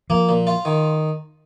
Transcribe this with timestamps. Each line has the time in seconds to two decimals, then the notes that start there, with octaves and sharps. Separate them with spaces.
0.10 F3 A#3
0.29 A#2
0.47 F4
0.65 D#3